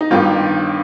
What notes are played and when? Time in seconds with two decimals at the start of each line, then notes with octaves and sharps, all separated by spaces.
0.01 D#4
0.10 G1 G2 D#3 F4